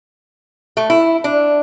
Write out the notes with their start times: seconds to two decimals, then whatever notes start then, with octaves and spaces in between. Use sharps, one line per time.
0.77 A3
0.90 E4
1.24 D4